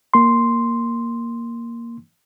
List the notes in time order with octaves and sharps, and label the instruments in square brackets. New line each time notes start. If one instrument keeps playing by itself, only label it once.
[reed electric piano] A#3 C6